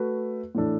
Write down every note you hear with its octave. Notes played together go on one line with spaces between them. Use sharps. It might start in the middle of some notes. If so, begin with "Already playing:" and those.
Already playing: A3 F#4 B4
A2 E3 D4 A4